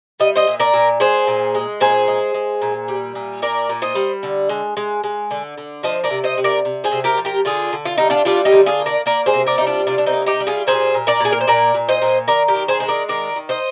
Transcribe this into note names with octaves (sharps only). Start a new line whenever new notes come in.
G3 D#5
C5 D#5
A#2
A#4 D5
A#2
G#3 G#4 C5
A#2
G#3
A#2 G#4 C5
G#3
G#3
A#2
G3
A#2
A#3 A#4 D5
A#2
C5 D#5
G3
D3
G#3
G#3
G#3
D3
D3
F3 C5 D#5
A#4 D5
C3
C5 D#5
C3
A#4 D5
C3
G#4 C5
C3
G4 A#4
F3
G4 A#4
D3 F4 G#4
D3
F4
G3 D#4
D4 F4
G3 D4 F4
D#4 G4
D3
F4 G#4
A#3
A#4 D5
A#3 A#4 D5
G#4 C5
C3
A#4 D5
G3 D#4
D4 F4
C3 D4 F4
D4
C4 D#4
A#3
D#4 G4
G3
F4 G#4
A#2 G#4 C5
A#2
A#4 D5
A#2 G#4
A#4
C5
A#2 A#4 D5
A#2
C5 D#5
A#2
D#3 A#4 D5
G4 A#4
D#3
G#4 C5
G#3 C5
A#4 D5
D#3 A#4 D5
D#3
C5 D#5